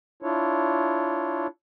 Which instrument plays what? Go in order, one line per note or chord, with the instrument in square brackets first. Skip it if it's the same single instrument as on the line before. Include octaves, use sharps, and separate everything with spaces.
[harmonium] D4 E4 F4 C#5